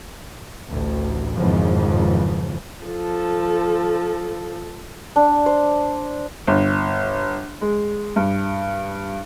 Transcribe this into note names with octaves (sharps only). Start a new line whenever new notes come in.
A1 D2
G#1 F2 G#2 C#3 E3 F3
F3 A4
D4
C5
G1
G#3
G2